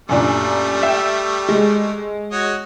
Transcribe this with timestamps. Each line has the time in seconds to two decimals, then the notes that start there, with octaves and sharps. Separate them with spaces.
0.09 F#2 A#2 G3 A3 D4
0.83 E5 G5
1.49 G#3
2.32 F#4 C#5 D#5